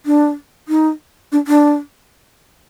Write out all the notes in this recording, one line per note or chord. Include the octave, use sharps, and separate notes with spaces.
D4
D#4
D4
D4